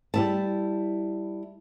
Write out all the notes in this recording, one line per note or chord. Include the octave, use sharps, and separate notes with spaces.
G3 E4 A5